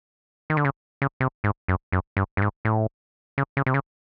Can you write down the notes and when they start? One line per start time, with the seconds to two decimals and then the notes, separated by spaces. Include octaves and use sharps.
0.50 D#3
0.57 D3
0.65 C#3
1.02 C#3
1.20 C3
1.44 G#2
1.68 F#2
1.92 F#2
2.17 G2
2.37 G2
2.42 G#2
2.65 A2
3.38 C#3
3.57 C#3
3.66 C3
3.74 C#3